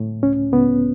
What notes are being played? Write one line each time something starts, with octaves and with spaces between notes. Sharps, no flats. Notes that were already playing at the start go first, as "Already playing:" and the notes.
Already playing: A2
C#2 C#4
C#2 B3